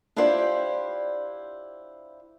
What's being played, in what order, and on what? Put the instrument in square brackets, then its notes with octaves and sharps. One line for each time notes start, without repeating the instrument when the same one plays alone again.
[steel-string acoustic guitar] D4 E4 F4 G4 C5 D5